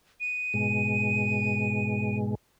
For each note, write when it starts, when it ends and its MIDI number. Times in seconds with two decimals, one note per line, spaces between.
0.20 2.17 99
0.54 2.35 44
0.54 2.35 47
0.54 2.35 56